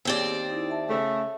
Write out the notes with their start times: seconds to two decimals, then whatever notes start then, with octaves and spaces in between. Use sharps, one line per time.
0.05 D#2 C4 G#4 C#5 D5
0.50 D#4 E4
0.70 E5 A5
0.89 C#3 A3